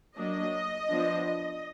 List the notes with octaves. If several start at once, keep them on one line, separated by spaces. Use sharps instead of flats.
F#3 A#3 D4 D#5
F3 B3 D4